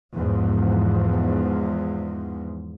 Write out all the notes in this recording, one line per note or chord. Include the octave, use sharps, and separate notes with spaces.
E2 G#2 F3